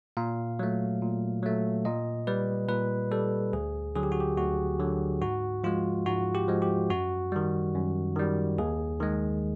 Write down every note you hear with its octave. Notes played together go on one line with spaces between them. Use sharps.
A#2 F5
F#3 A3
A#2
F#3 A3
A#2 D#5
G3 B4
A#2 B4
G3 A4
D2 G#4
D3 F#3 G#4
G4
F#4
G4
D2 F#4
D3 F#3
G#2 F#4
F3 G#3 F4
G#2 F#4
G4
F3 G#3
G4
F#2 F#4
D#3 G3
F#2
D#3 G3
D#2 G#4
D#3 G#3